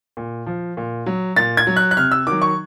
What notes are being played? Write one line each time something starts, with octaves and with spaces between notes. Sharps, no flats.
A#2
F3
A#2
F#3
A#2 A6
G#6
F#3
F#6
F#6
C3 F6
E6
D#3 F#3 D6
C#6